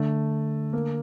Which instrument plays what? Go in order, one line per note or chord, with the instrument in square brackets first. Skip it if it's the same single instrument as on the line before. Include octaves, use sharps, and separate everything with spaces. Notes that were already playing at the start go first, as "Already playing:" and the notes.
Already playing: [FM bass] D3 [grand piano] A3
[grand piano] A#3